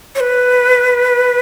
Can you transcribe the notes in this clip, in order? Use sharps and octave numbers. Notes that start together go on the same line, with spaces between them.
C#5
B4